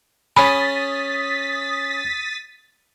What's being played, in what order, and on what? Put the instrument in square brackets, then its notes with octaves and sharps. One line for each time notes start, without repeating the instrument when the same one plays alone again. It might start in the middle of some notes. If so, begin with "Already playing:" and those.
[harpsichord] C#4 G#4 [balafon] B5 [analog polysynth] D#6 A6 B6